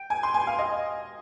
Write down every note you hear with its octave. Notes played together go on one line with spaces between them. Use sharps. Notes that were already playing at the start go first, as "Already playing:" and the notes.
Already playing: G5
G#5
C6
G#5
F5
D#5